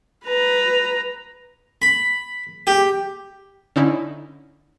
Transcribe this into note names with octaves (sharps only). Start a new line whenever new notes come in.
B4 A#5
B5
G4
D3 C#4 D#4 E4